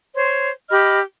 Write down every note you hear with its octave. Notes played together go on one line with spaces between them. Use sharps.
C5 C#5 C6
G4 D#5 B5 F6